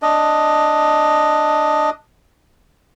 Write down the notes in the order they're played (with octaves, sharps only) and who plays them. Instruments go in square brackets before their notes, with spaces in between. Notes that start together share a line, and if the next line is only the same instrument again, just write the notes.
[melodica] D4 D#5